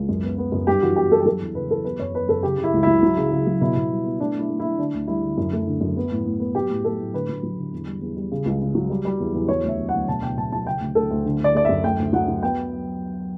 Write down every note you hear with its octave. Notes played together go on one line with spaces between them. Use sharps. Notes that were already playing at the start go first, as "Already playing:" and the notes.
Already playing: C#2
F#2
B3
B3
F#2
G2 G4
E3 F#4
B3 G4
G2 A4
G4
F#3 A4
E2
C#3 B4
E2 A4
B3 B4
F#2 C#5
B3 B4
F#2 A4
C#3 G4
C#3
E4
C#2
F#3 E4
F#3
C#3
C#3
F#3
B2 E4
B2
G3
B3
A3 D4
A3 E4
A3
A3 E4
D3 D4
D2
G3 E4
D3
F#2
A3
D3
F#2
B3
A2
A2
B3
F#3 G4
A2
A3 A4
A2
D3 B4
F#3
F#3
D3
E2
G3
E2
G3
C#3
C#2
C#3
F#3
G3
G3
E2
E2
F#3 C#5
D2
E5
B3
D2 F#5
B2 A5
B2 G5
B2 A5
F#3 A5
C#3 G5
D2
D2 A4
D2
D3
D3 D5
A3 D5
F#2 E5
A3 G5
D2
F#3 F#5
F#3
B3 G5